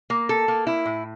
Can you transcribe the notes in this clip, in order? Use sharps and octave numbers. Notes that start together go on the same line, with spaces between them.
A#3
A4
A#3
E4
A2